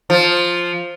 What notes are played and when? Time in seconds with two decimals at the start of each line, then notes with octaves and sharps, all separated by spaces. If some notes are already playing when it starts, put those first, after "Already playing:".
0.10 F3